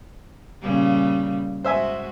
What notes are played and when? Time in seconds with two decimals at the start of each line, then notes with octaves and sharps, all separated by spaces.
0.62 A#2 C#3 G3
1.64 G#2 F#4 C5 E5 G#5